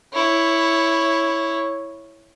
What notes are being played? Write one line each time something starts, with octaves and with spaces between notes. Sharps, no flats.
E4 C#5